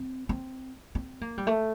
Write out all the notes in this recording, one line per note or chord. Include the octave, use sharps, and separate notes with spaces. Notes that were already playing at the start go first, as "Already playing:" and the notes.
Already playing: C4
C4
C4
A#3
G3
A3